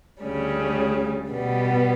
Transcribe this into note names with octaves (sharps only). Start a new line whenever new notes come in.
D2 C#3 G3 C#4
B2 G3 B3